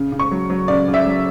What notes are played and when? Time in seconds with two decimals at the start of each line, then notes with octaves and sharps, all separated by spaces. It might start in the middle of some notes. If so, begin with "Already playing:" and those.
Already playing: C#3
0.12 C#3
0.19 C#6
0.31 F#3
0.50 F#3
0.68 C#3 D5
0.88 C#3
0.94 E5
1.06 F#3